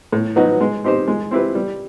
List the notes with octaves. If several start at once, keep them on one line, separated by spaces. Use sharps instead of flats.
A2
F#3 B3 D#4 F#4
G#3
C4 D#4 G4 C5
G#3
C4 E4 G4 B4
G3